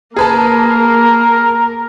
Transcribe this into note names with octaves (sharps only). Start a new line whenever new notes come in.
A#3 G#4 A#4 B4 A5